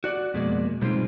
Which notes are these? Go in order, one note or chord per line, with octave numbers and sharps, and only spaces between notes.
F#4 D5 F#5
F2 B2 G#3 A#3 D5
B2 G3 G#3 C4 D#4 F4